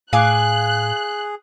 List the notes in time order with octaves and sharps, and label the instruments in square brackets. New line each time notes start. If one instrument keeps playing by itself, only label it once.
[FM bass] A2 [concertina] G#4 [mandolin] F5 G#5 D6 [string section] F#6